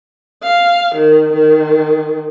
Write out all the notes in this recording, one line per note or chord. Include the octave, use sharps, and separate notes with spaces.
F5
D#3
D#3